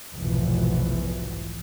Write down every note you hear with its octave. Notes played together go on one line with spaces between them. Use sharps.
F1 B1 G#2 B2 E3 F3